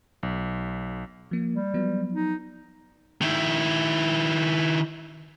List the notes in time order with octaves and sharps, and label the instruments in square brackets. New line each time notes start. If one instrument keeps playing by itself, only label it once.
[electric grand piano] B1
[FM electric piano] F3 A#3
[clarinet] G3
[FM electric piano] F3 F#3 B3
[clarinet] D#4
[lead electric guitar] D#3 E4